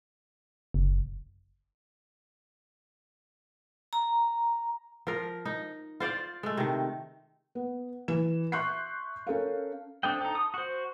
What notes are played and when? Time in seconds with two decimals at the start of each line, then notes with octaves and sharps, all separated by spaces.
0.74 F#1
3.93 A#5
5.07 F3 A#4
5.45 D#4
6.00 F4 C5 D5 F5
6.43 G#3 A3
6.57 C3 D#3
7.55 B3
8.08 E3 E7
8.52 E5 C6 C#6 F#6 G6 C7
9.27 C#4 A4 A#4 F5
10.03 C4 D4 A4 D#5 G5
10.21 D#4 A4
10.35 D#6
10.54 F#4 C5